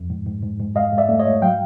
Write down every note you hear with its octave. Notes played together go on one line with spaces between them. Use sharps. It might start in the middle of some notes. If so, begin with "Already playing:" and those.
Already playing: F2
G#2
G#2
G#2
G#2
G#2 D#5 F5
G#2
D5 E5
A3
C#5 D#5
G#2
F#3 F5 G5